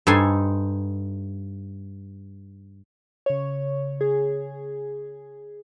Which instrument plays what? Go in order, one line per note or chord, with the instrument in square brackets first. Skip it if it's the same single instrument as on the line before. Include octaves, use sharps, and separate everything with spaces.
[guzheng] G2 D#4 A4 C5 G#5 C6
[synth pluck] C#3 C#5
G#4